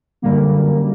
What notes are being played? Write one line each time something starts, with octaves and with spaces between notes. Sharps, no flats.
F#2 D3 G3 A#3